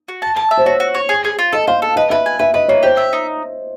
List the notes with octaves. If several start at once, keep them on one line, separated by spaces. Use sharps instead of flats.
F#4
A5
A5
E5
C5
F#4 C#5
F#4
C#5
G#4
G#4
F4
A4 D#5
C5 F5
A4
B4 D#5
B4 E5
G#5
B4 E5
B4 D#5
A#3 C#5
G4 C5
E5
D#4